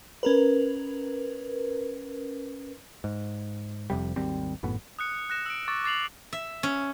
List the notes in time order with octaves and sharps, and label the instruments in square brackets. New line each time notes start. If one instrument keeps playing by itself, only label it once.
[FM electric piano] C#4 A#4 B4
[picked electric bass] G#2
F1 F2 C3 G3
G#1 D#2 G3 C4
G#1 F#2 A2 B3
[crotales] D#6 F#6 C#7
F#6 A#6 E7
E6 D7
C#6 D6 E6 A6
D6 A6 C7 F7 F#7
[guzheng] E5
C#4